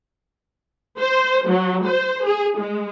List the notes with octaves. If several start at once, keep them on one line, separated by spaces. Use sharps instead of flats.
C5
F#3
C5
G#4
G#3